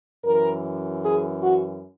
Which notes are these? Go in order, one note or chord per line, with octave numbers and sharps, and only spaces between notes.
F#2 E3 A#4
G#4
F#4